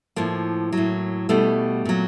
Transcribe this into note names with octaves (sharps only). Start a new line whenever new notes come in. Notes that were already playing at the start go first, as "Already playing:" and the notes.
A2 F3 A#3
A2 F#3
B2 G3 A3
A#2 F#3